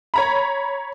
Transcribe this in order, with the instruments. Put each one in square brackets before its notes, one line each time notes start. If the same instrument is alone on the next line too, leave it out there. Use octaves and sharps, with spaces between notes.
[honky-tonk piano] C#5 A#5 B5